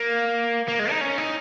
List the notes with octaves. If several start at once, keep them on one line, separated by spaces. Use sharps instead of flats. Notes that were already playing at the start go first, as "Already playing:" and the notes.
Already playing: A#3
A#3
G#3
D#4
C#4
D#4